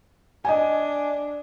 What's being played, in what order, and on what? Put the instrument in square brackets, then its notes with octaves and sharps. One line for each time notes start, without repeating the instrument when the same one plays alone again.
[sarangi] D4 [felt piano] D#5 G#5